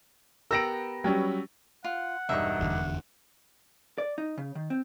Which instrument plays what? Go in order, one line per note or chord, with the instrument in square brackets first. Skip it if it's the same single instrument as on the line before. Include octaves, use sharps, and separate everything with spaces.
[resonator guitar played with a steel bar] B3 G4 A#4 [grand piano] E6 A#6 D7
[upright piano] F#3 G3 C#4 [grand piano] G5
[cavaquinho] F4 [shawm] F#5
[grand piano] E1 G2 D#4 [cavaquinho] E5 C#6
[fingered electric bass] F1 E2 D3
[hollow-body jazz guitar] D5
D#4
C#3
D#3
C4